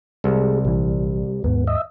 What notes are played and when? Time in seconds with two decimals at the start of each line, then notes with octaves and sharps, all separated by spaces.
0.24 C2 G3 G#3
0.65 A#1 E3 G3
1.44 D#2 G#2 B3
1.67 D#5 E5